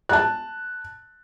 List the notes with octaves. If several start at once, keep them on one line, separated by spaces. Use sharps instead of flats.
A5 F#6